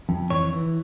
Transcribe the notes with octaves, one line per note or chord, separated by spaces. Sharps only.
F2
E3 C#5
E3